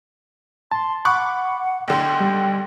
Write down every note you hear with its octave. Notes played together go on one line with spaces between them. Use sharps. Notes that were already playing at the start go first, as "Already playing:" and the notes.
A5 C6
F#5 B5 C#6 D6 F#6
B1 D3 G5 C6
G3